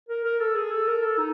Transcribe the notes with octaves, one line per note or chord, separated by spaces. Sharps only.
A#4
A#4
A4
G#4
A4
A#4
A4
D#4